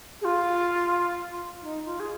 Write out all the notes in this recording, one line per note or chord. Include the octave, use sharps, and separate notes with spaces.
G#4
F4
D#4
F4
G#4